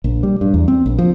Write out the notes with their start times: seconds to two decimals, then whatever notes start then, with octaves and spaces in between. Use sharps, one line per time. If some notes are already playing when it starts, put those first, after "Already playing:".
0.04 A#1
0.23 G3
0.41 G2
0.54 E2
0.68 C4
0.86 A#1
0.99 F3